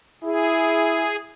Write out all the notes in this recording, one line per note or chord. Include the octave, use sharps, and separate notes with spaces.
E4 G#4